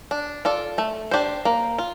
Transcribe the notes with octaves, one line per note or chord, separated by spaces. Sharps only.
D4
F4 A4 D5
A3
D4 G4 C5
A#3
F4